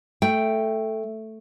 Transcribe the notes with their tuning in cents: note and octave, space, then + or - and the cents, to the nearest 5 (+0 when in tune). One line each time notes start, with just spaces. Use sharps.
A3 +0 G5 +0